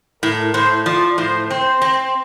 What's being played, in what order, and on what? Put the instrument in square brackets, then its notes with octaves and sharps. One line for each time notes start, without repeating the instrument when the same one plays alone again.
[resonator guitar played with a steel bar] A2 [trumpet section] A#4
[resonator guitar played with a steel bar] A2 [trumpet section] C5
[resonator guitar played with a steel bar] F3 [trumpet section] D5
[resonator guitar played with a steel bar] A2 [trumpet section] C5
[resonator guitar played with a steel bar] C4 [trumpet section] C5
[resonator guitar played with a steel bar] C4